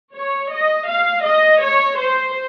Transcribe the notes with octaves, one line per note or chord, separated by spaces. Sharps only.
C#5
D#5
F5
D#5
C#5
C5